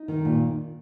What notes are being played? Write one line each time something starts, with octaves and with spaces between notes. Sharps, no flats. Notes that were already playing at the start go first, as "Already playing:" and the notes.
Already playing: D#4
D#3
A#2